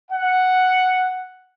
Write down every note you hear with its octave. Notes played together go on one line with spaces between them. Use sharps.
F#5